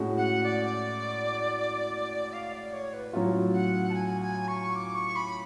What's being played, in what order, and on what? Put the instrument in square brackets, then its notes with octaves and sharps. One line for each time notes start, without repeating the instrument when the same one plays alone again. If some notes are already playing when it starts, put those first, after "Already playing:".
Already playing: [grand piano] A2 G#3 C#4 F#4
[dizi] F#5
D5
F5
D5
C#5
B4
[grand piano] A2 F#3 C#4 F4
[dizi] F#5
A5
G#5
G#5
C#6
D6
C#6
B5